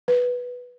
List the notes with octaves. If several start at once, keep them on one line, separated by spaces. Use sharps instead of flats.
B4